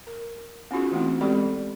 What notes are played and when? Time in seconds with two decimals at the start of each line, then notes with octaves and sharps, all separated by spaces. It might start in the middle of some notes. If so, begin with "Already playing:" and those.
0.07 A#4
0.71 B3 C#4 D#4 F4 F#4 G#4
0.91 E3 A3 B3 C4 E4
1.21 G#3 C4 G4 A4 D5 B5